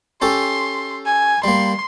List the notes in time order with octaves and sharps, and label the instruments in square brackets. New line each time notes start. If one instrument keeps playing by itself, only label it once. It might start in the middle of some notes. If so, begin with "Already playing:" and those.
[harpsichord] C#4 G4 A4 [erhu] C6
[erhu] G#5
[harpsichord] G3 A#3 [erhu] C6